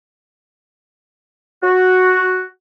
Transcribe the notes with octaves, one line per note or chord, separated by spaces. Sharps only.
F#4